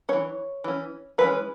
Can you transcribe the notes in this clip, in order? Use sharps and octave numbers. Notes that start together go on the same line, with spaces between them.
E3 C#4 C#5
E3 C#4
E3 G#3 C#4 B4